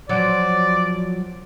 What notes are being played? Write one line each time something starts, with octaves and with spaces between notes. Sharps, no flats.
F3 F#3 D5